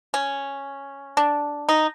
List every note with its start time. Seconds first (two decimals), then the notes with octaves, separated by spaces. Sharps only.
0.14 C#4
1.17 D4
1.69 D#4